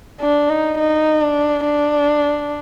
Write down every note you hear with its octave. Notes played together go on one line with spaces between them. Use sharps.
D4
D#4
D#4
D4
D4